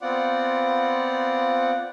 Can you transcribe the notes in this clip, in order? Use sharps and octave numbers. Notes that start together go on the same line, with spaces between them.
B3 C4 F4 D5 F#5